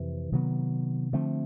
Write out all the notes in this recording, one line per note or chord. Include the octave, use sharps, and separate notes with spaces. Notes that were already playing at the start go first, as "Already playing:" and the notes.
Already playing: F2 C3 E3
C3 D#3 F#3 B3
D3 F3 A3 C4